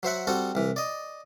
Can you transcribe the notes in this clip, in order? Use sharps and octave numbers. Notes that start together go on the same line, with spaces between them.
F#3 C5 E5 F#5
G3 C4 F#4 A4
C2 E3
D5 D#5